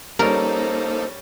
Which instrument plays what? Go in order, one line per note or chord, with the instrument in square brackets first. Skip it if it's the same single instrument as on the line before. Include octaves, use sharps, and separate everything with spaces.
[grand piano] G3 C#4 [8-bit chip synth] A#3 D#4 A4 [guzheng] A#4 [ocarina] C5